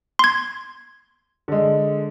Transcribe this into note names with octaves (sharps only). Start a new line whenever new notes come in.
C6 G#6
D3 G#3